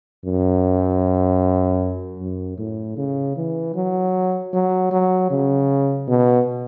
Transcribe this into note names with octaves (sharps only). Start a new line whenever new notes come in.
F#2
F#2
A2
C#3
E3
F#3
F#3
F#3
C#3
B2